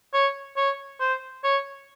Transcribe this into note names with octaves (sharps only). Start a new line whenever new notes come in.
C#5
C#5
C5
C#5